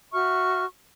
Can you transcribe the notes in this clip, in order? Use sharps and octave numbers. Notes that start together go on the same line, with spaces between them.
F#4 E5 C#6 F6